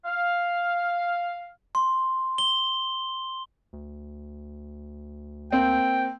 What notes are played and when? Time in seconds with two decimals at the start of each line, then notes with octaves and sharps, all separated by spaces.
0.05 F5
1.75 C6
2.38 G7
3.73 D2
5.52 A#3 C4 G5